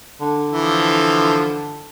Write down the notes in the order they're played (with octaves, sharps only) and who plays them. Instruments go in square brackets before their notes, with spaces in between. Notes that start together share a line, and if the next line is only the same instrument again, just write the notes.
[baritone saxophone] D3
[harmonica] E3 F3